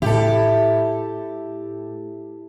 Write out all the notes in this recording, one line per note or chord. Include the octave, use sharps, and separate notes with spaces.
A2 E4 G4 A4